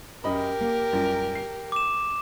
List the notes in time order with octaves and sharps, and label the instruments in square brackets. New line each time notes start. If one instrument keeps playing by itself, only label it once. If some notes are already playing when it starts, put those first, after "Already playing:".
[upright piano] F#2 D#5 B5 [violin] G4 A#4
[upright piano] A#3
F#2 G3 F4
C7
[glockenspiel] D6 E7